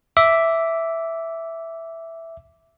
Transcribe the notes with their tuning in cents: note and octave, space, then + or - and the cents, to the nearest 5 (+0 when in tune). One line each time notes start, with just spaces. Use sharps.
E5 +0 D6 -10